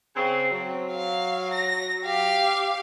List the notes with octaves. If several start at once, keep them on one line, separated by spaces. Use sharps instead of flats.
C#3 C4
F#3 C4
F5
A#6
G4 F5